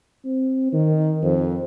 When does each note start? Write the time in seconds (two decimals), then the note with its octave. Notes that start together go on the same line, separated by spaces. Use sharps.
0.25 C4
0.73 D#3
1.23 F2